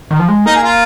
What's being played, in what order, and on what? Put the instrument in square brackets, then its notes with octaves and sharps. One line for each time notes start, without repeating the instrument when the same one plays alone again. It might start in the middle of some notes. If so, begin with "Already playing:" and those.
[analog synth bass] D#3
F3
G#3
[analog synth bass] A#3 [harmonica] D#4
[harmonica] G#4
F4